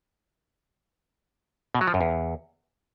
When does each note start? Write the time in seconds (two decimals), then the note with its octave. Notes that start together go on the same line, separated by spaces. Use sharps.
1.75 B2
1.81 F#3
1.88 F3
1.94 F#2
2.01 E2